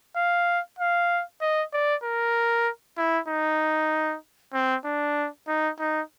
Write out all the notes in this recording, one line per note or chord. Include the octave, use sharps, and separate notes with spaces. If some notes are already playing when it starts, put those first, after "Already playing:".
F5
F5
D#5
D5
A#4
E4
D#4
C4
D4
D#4
D#4